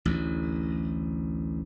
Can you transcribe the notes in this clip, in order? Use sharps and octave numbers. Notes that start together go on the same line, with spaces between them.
A1 D2